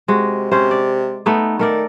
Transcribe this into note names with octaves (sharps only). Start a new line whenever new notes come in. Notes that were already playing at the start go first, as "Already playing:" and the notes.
C3 G#3 F#4
C3 C#4 C5
D5
A3 B3 D#4
D#3 A3 A#4 D5